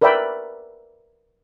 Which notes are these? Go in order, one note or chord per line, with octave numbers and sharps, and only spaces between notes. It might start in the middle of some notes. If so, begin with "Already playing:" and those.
A#4 B4 D5 E5 G5 B5